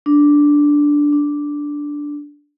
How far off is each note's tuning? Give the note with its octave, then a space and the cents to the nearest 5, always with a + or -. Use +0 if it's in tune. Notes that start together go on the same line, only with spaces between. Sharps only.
D4 -5
D4 -5